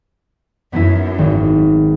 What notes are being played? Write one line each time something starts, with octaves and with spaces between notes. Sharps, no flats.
F#2 B3 E4
G#1